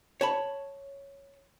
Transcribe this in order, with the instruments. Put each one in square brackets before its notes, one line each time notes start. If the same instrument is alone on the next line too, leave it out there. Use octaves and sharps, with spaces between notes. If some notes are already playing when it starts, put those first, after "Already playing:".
[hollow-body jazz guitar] C#5 A5 B5